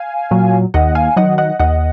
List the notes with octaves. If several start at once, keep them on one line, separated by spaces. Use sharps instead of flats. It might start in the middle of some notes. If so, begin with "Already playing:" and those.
Already playing: F5 G#5
A#2 F#3
D#2 D#5 F#5
F5 G#5
D#3 F#3 D#5 F#5
D#5 F#5
D#2 D#5 F#5